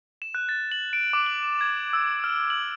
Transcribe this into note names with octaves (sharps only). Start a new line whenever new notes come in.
E7
F#6
A6
F#7
D7
D6
F#7
E7
G#6
E6
F6
F#7